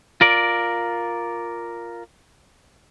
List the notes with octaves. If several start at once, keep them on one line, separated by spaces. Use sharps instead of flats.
F4 A#4 D5